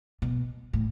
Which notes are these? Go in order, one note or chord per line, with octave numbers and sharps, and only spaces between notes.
B2
A2